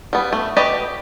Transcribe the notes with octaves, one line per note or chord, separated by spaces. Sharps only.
G3 B3
A3
F#4 G4 B4 D5 D#5